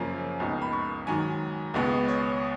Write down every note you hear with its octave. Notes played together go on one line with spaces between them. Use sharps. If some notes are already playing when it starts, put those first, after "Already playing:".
Already playing: F#2 C#3 F3 A#3 C#4
C#2 B2 A#3 D#4
B5
C#6
G#2 D#3 F#3 G#5
C#2 B2 G#3 B3
C#5